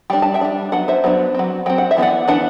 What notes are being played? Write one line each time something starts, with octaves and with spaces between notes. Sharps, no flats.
G3 D4 G5
A5
E5 G5
G3 D4
F#3 B3 D4 F#5
C5 E5
F#3 B3 D4
F#3 C4
F#3 C4 G5
F#5
E5
E3 B3 D4
D5 F#5
E3 B3 D4 F#5